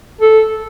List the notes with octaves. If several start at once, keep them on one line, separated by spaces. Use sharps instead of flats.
A4